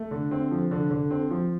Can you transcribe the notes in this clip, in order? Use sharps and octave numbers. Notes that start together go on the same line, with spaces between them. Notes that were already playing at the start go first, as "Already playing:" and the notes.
Already playing: A3
D3
C4
F3
D3
D3
C4
F3